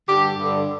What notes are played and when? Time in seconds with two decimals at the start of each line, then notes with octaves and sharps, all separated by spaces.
0.08 G2 D3 G4
0.38 G2 D3